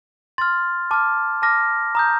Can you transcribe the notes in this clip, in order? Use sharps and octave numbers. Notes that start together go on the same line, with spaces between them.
C6 F6 A6
A5 D6 F6
A5 D6 F6 A#6
A#5 D#6 G6